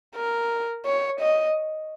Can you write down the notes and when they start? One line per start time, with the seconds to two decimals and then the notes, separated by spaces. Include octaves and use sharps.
0.15 A#4
0.86 C#5
1.20 D#5